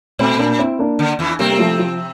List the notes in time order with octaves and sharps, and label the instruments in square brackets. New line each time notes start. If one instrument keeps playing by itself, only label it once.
[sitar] A#2 [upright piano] A3 C4
[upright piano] A#3 D4
C4 E4
A#3 D4
[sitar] D3
E2 E3
[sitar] C3 C4 [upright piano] G3 A#3
[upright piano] A#3
F3 A3
F3